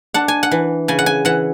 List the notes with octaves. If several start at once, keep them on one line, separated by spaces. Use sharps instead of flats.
D4 F#5
G#5
F#5
E3
C#3 G#5
F#5
G#5
E3 F#5